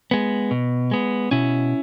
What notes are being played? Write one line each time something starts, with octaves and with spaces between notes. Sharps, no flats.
G#3 B3
B2
G#3 B3
B2 C#4 E4